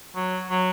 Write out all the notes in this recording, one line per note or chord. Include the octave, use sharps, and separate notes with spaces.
F#3
F#3